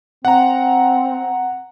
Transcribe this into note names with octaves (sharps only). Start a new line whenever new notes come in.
C4 F#5 A#5